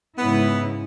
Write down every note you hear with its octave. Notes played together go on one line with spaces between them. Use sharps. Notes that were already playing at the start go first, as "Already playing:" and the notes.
G#2 C#3 B3 E4